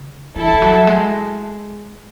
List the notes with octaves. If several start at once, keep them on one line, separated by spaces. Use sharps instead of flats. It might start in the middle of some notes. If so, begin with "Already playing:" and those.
Already playing: C#3
E3 E4 A4 E5 A5
E3
F#3
G#3